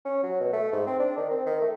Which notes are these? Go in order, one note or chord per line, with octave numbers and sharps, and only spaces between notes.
C#4
F#3
B2
A3
G#2
C4
D4
D#3
C4
D#3
A3